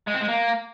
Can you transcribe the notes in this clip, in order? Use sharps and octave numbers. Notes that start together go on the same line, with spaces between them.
G#3
C4
G#3
A#3